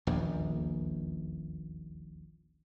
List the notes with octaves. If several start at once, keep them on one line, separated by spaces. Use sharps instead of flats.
D#1 A#1 E2